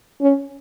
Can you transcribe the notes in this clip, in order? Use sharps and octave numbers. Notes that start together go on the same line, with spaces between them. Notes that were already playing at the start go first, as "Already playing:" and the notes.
C#4